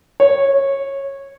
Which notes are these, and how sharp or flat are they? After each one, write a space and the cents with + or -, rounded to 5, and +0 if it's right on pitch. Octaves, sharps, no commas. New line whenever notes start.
C#5 -15